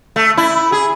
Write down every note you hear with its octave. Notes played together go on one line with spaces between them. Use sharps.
A3
E4
G#4